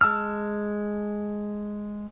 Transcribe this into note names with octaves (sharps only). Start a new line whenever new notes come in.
G#3 A5 E6 F6